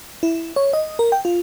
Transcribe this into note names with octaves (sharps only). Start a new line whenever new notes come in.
E4
C#5
D#5
A#4
G5
F4